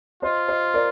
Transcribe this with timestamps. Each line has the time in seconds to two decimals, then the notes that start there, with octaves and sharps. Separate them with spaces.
0.22 F4 C5 D#5
0.48 C5 D#5
0.74 A#4 D5